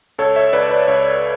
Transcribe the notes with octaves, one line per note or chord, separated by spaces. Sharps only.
C#2 A4 C#5
C#5 E5
C#2 B4 D5
B4 D5
C#2 C#5 E5